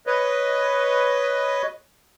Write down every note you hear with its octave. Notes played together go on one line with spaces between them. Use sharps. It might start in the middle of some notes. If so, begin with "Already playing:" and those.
B4 C#5 D#5